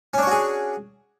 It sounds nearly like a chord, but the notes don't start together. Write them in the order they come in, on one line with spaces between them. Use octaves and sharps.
C#4 D4 C#5 F#4 G#4